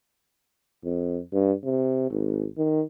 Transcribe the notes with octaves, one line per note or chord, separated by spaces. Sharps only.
F2
G2
C3
G#1
D#3